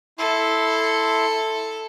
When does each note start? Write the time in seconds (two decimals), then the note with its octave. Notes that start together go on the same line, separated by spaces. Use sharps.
0.18 E4 A4 C6